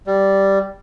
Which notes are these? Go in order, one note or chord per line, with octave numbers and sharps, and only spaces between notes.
G3